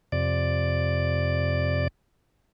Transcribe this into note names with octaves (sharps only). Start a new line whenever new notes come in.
F2 C3 D5